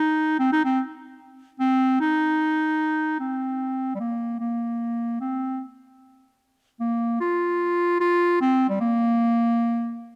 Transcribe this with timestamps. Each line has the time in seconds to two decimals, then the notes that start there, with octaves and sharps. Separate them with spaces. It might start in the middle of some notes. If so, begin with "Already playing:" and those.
Already playing: D#4
0.39 C4
0.53 D#4
0.65 C4
1.60 C4
2.00 D#4
3.20 C4
3.95 G3
4.00 A#3
4.40 A#3
5.21 C4
6.80 A#3
7.20 F4
8.00 F4
8.41 C4
8.70 G3
8.80 A#3